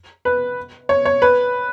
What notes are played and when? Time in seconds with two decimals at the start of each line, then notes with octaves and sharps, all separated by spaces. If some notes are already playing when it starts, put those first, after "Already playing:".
0.25 B4
0.89 C#5
1.05 C#5
1.22 B4